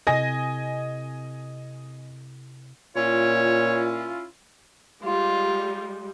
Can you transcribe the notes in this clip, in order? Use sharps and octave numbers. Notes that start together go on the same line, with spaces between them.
C3 E4 A4 D#5 G#5 A#6
A#2 C#4 E4 F4 C#5
G3 G#3 F4